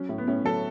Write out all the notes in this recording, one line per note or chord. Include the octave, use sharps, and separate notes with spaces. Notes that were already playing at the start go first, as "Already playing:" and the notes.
Already playing: F#3 C#4
A2
B3
A2 C#4
F#3 A4